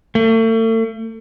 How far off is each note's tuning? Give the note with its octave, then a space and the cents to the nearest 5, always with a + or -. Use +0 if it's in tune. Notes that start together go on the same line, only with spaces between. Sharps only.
A3 +40